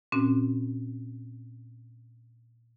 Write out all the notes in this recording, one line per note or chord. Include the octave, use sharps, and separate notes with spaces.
A#2 C4 C#4 F#4